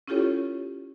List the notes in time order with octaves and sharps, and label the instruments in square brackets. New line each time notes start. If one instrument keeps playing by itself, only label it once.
[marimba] C#4 E4 F4 G4 A4 C#5